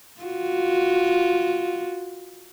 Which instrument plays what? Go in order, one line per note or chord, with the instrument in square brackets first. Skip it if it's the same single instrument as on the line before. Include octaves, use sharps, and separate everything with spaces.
[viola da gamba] F4 F#4